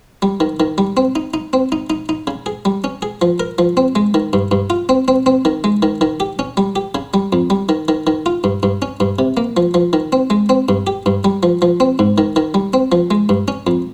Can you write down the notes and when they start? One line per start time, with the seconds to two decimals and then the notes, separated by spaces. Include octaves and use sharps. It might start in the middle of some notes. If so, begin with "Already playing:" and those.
0.22 G3
0.40 D#3
0.60 D#3
0.78 G3
0.97 C4
1.16 D#4
1.34 D#4
1.53 C4
1.72 D#4
1.90 D#4
2.09 D#4
2.27 C#3
2.46 G#4
2.65 G3
2.84 C#4
3.02 G#4
3.22 F3
3.40 A#4
3.58 F3
3.77 C4
3.95 G#3
4.14 D#3
4.33 G2
4.51 G2
4.70 F4
4.89 C4
5.08 C4
5.26 C4
5.45 D#3
5.64 G#3
5.82 D#3
6.01 D#3
6.20 G4
6.39 C#4
6.57 G3
6.76 G4
6.95 C#3
7.14 G3
7.33 F2
7.50 G3
7.69 D#3
7.88 D#3
8.07 D#3
8.26 F4
8.44 G2
8.63 G2
8.82 C#4
9.00 G2
9.19 C3
9.37 A#3
9.57 F3
9.74 F3
9.93 D#3
10.12 C4
10.30 G#3
10.49 C4
10.69 G2
10.87 G4
11.06 G2
11.24 G3
11.43 F3
11.62 F3
11.80 C4
11.99 G#2
12.18 D#3
12.36 D#3
12.54 G3
12.74 C4
12.92 F3
13.11 G#3
13.29 G2
13.48 C#4
13.67 F2